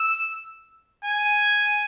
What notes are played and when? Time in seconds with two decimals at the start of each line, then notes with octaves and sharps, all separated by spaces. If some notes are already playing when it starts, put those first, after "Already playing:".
Already playing: E6
1.05 G#5